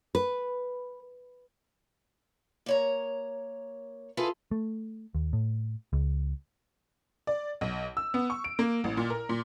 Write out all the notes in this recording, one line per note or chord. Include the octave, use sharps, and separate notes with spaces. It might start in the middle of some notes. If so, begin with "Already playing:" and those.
B4
A#3 C#5 A#5
E4 F4 G#4 A4 B4
A3
D#2
A2
C#2
D5
B1
E6
B3
C#6
D7
A#3
A1
A#2
A#4
A#2